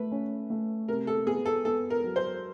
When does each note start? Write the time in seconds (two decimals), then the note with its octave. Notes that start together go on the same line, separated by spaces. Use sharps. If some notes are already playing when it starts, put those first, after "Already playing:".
Already playing: A3 B4
0.12 C#4
0.50 A3
0.88 C3 A#4
1.07 A4
1.26 B3 G#4
1.46 A4
1.65 B3 A4
1.90 A#4
2.04 F#3
2.16 C5